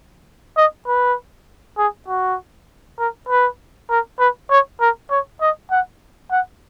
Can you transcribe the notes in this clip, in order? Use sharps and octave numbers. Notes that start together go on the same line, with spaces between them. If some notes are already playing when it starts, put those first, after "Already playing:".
D#5
B4
G#4
F#4
A#4
B4
A#4
B4
C#5
A#4
C#5
D#5
F#5
F#5